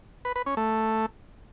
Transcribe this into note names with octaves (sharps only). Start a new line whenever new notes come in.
B4
B4
C#4
A3